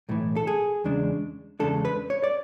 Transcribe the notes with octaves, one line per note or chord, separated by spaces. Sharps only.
B1 A2 E3
A4
G#4
E2 C#3 G#3 D4
E2 C#3 G#3 D4 A4
B4
C#5
D5